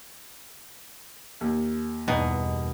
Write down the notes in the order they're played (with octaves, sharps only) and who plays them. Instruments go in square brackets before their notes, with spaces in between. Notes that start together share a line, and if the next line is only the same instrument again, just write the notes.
[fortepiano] D#2
[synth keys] E2 G2 [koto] B2 [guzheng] D#4